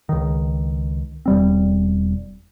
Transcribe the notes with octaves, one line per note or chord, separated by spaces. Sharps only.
C#2 D#3
E1 G3 C4